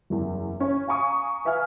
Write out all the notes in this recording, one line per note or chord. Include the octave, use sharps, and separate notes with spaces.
F#1 E2
C#4 C#5
F5 G#5 A#5 C#6 D#6
B4 E5 F5 G#5 F6